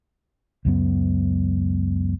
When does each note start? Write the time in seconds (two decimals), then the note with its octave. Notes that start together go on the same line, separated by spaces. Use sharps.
0.65 C#2 F#2 B3